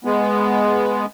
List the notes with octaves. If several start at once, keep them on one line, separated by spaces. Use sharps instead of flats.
G#3 B3